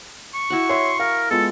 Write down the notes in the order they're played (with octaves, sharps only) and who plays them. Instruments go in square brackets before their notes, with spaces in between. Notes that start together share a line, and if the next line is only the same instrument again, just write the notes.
[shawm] C#6
[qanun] E4 F#4 F#5
[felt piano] C#5 E5 [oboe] C6
[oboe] A#4 [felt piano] F5
[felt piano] G#3 B3 F4 [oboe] A4